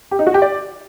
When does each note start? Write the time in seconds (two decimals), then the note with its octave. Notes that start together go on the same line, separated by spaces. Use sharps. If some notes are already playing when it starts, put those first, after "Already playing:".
0.11 G4
0.19 D#4
0.27 F#4
0.34 G4
0.42 D5